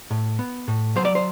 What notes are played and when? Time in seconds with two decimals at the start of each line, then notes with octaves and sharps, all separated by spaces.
0.10 A2
0.39 B3
0.68 A2
0.96 F#3 C5
1.05 D5
1.15 C5